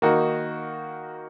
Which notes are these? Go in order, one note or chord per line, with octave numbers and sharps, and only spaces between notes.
D#3 A#3 D#4 F#4